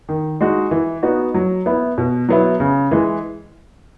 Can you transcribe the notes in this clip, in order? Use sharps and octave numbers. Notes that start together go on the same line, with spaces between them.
D#3
G#3 D#4 F#4
E3
B3 D#4 F#4
F#3
B3 E4
B2
F#3 B3 E4
C#3
E3 G#3